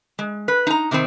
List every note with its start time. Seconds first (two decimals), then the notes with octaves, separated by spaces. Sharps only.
0.19 G#3
0.48 B4
0.67 D#4 A#5
0.91 C3 D#3 B3 C4